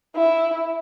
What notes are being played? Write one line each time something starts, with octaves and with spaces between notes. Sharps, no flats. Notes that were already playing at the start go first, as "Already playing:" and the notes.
E4